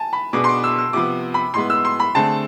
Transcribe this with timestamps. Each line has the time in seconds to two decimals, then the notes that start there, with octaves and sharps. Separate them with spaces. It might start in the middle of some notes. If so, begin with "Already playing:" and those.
Already playing: G#5 A5
0.13 B5
0.33 B2 B3 D4 G#4 B4 D6
0.44 C6
0.49 D6
0.64 E6
0.79 E6
0.93 C3 F3 B3 D6
1.34 B5
1.54 A2 G#3 B3 C6
1.70 E6
1.85 C6
2.00 B5
2.15 D3 A3 C4 G#4 A5